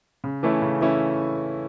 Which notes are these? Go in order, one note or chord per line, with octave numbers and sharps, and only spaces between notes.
C#3
E3 A3 C#4 E4
C#3
E3 A3 C#4 E4